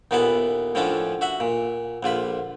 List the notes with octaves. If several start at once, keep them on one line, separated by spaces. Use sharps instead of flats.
D#2 A#2 B3 E4 A4 F#5
A2 D3 F3 C#4 D4 A4
F#4 E5 F#5
A#2
A#1 D3 F4 B5